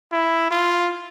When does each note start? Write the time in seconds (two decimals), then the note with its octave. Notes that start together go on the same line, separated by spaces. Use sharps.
0.12 E4
0.51 F4